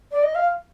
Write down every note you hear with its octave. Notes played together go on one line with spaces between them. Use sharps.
D5
D#5
F5